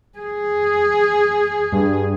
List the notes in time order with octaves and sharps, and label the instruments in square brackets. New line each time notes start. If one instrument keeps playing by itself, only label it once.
[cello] G#4
[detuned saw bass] G2